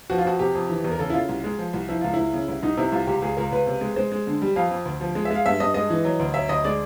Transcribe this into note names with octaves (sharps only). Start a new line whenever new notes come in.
F3 F#4
F4
F2 F#4
C3 G4
F2
E3
E2
A#4
C#3 A4
E4
C#3 F4
C2
G#3
F3
C2
F3 E4
C#2 F4
C#2 E4
C#3
C2 E4
C2 D#4
C3 E4
C2 F4
C#2 G4
C#2 G#4
C#2 A#4
C#2 B4
C3
G#3
G#3 C5
G#3
D3
G3
F2 F5
F2
D2
F3
G#3
E5
G#3 F5
G2 E5
G2 D#5
G#3 D#5
E3
F#3
D2
F#3 E5
D2 D#5
G#3 D5